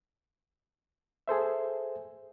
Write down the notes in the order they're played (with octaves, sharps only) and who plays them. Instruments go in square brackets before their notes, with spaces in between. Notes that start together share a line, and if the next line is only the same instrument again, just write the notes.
[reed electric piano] G#4 A4 C5 E5